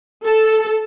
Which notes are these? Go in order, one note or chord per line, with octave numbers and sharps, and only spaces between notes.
A4